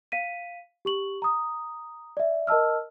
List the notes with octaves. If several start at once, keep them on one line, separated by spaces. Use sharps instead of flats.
F5 B6 D#7
G4 C#6 F#7
A#5 D#6
D5 E5
A#4 D#5 A5 E6 F6